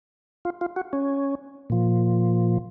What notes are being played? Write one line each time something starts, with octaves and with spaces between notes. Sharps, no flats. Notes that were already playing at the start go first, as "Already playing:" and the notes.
F4
F4
F#4
C#4
A#2 F3